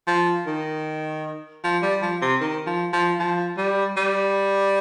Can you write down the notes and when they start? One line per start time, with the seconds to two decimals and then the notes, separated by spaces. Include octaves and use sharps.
0.07 F3
0.47 D#3
1.64 F3
1.82 G3
2.02 F3
2.22 C3
2.41 D#3
2.67 F3
2.93 F3
3.20 F3
3.58 G3
3.97 G3